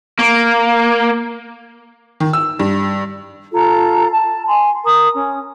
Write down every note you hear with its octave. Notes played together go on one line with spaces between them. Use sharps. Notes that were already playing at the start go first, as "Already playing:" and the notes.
A#3
D#3
E6
G2
F4 A4 A#5
A5
G#5 C6
A#4 A#5 D#6
C#4